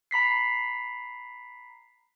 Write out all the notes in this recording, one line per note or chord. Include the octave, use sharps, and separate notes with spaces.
A#5 B5 B6 C7